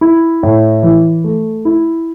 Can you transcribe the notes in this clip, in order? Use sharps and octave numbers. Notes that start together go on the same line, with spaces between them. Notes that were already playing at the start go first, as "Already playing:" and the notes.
E4
A2
E3
A3
E4